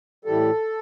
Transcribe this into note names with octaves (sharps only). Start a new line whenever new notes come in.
A2 E3 G3 A4